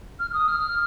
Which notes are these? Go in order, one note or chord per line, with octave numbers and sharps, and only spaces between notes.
F6
F6
D#6
F6